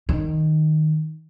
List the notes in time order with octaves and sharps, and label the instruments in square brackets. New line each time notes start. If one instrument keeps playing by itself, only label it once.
[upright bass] D#3